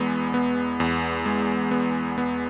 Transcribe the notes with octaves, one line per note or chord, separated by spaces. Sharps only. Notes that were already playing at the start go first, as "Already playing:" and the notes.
Already playing: E2 G#3 B3
B3
E2
G#3
B3
B3